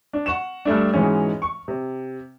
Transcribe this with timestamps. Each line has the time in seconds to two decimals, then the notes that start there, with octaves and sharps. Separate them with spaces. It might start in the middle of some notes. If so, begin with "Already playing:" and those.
0.13 D4
0.26 F#5 C#6 E7
0.65 G2 G3 A3 D4
0.94 G#2 B2 E3 G#3 C#4
1.42 C#6
1.68 C3